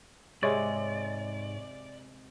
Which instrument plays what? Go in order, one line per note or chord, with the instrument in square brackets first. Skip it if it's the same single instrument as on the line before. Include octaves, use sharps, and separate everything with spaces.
[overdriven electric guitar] G#2 [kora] C3 G#3 [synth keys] C#5 [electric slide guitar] D5